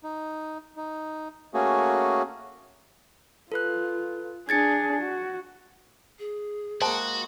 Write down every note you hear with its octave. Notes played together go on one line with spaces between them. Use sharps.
D#4
D#4
A3 A#3 C#4 F#4 G#4
F4 A4 B4 F#6
D4 G#4 G#6 A6 C#7
F#4
G#4
G#3 A#3 F#4 C5 G5 A5